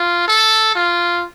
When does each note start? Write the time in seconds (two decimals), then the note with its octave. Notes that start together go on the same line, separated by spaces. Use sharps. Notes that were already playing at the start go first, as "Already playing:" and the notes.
Already playing: F4
0.28 A4
0.75 F4